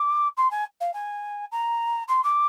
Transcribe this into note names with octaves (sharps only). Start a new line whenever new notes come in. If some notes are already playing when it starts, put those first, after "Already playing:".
Already playing: D6
C6
G#5
F5
G#5
A#5
C6
D6